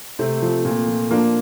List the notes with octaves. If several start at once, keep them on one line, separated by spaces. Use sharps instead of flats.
C3 A3 C4
F3
A#2
F3
F3 A#3 D4